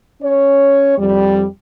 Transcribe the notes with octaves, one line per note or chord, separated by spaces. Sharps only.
C#4 C#5
F2 G3